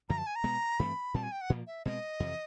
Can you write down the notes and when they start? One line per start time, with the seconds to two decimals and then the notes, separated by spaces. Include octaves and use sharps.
0.09 F#2 D3 F3 A#5
0.18 A5
0.26 G#5
0.36 A#5
0.44 B2 G#3 B3
0.79 G2 E3 A3 C4 B5
1.14 A#2 G3 C4 A5
1.23 G#5
1.32 G5
1.41 F#5
1.50 A#2 F3 A#3
1.67 E5
1.85 B2 G#3 C4 D#5
2.20 F2 C3 E3